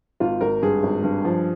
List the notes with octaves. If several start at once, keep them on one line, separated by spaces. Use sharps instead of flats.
G#1 F4
G#1 A#4
G2 G#4
G#1
G2
F3